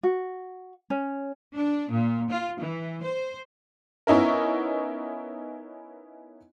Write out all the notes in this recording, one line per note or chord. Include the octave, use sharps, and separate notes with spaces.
F#4
C#4
D4
A#2
F4
E3
C5
B3 C#4 D#4 E4 A#4